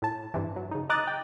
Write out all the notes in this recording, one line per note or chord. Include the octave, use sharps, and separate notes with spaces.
A2 A5
G2 C3 E3
F#3
C#3 D#4
D#5 A#5 D6 D#6 F#6 A6
G5